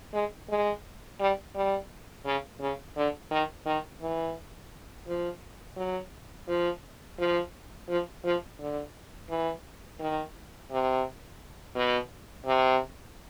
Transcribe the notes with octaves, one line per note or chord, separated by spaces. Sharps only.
G#3
G#3
G3
G3
C#3
C#3
D3
D#3
D#3
E3
F3
F#3
F3
F3
F3
F3
D3
E3
D#3
C3
B2
C3